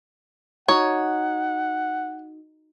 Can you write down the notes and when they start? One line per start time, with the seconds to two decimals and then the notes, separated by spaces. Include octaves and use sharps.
0.68 D#4 F#4 C#5 F#5